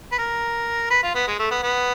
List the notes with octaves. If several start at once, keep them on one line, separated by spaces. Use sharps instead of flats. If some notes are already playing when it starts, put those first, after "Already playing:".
B4
A#4
B4
F4
B3
G#3
A3
B3
B3